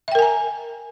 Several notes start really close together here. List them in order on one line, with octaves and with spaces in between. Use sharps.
E5 G5 A#4 G#5 A#5